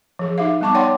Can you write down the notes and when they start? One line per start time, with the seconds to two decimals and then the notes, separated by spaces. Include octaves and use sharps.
0.19 F3 G#4
0.38 D#4 G4 E5 F5
0.60 G3 B3 D#4 A5 C#6 D6
0.74 C#5 D5 F#5 G5 C6 D6